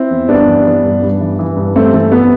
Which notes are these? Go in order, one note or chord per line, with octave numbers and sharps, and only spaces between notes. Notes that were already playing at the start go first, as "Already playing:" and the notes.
Already playing: C4 E4
E2
G2 B3 D4
E3
E3
G2
G2
E3
E3
G2
G2 A3 C4
E3 A3
E3 B3